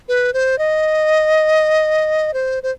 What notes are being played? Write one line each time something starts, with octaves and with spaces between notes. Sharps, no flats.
B4
C5
D#5
C5
C5